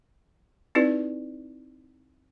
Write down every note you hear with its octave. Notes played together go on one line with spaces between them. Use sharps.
C4 D#4 E4 G4 B4 D5